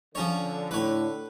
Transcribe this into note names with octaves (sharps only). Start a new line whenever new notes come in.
D3 F3 C#4 C#5
A2 B4 C#5